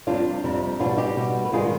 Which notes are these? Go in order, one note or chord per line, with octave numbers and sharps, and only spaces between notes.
F2 C3 G3 D4 F4
F2 C3 G3
B2 G3 D4 F4
D#4 G4
B2 G3
B4
G2 D#3 G#3 F4 G#4